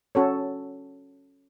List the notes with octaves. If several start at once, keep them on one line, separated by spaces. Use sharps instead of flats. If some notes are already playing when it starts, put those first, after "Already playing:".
C#4 F#4 A4 C#5